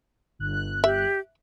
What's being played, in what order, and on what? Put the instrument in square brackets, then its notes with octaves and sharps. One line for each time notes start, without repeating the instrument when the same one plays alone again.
[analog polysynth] G1 F#6
[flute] G4 [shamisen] E5